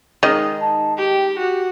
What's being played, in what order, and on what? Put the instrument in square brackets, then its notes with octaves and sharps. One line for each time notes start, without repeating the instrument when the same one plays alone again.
[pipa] D#3 D#5 [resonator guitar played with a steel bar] G#3 D#4
[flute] A5
[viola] G4 [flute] G5
[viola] F#4 [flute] G4